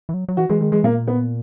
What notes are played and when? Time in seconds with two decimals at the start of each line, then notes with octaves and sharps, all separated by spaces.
0.09 E3
0.14 F#3
0.29 F#3
0.37 E3 F#4
0.49 E3 G#3
0.61 D#3 G#3
0.72 E3 G#3
0.84 A#2 A#3
1.07 B3